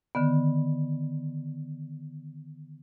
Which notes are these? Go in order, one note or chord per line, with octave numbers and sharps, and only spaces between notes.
D3 D#3 B3